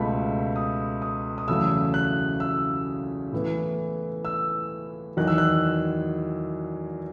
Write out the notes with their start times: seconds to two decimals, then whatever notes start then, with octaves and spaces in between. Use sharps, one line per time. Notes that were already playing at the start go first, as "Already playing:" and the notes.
Already playing: C#2 B2 A3 B5
0.56 D#6
1.02 D#6
1.38 D#6
1.48 E2 C#3 F#3 A3 E6
1.94 F#6
2.40 E6
3.32 A2 E3 B3
4.25 E6
5.17 E2 D#3 F#3 F#6
5.28 E6
5.38 F#6